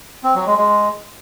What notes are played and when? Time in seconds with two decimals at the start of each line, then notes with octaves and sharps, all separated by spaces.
0.24 C4
0.35 F#3
0.46 G#3
0.57 G#3